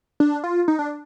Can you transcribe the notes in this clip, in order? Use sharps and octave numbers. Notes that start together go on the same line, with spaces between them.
D4
F4
D#4
D4